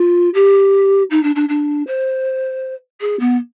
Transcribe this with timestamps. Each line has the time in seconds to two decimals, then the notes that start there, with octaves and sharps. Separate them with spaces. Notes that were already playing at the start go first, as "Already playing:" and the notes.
Already playing: F4
0.34 G4
1.10 D#4
1.23 D4
1.35 D4
1.49 D4
1.87 C5
3.01 G#4
3.20 B3